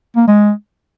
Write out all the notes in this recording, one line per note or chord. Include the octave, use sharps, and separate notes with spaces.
A#3
G#3